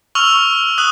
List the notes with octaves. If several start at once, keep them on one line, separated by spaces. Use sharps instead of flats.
C#6 E6 F6 F7
D#6 F#6 F#7